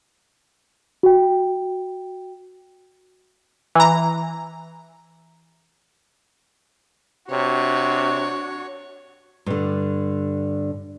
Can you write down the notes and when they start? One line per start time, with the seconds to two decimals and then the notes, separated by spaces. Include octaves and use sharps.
1.03 F#4 G5
3.75 E3 A#5
7.31 C3 D4 F#4 C#5
9.46 G2 D3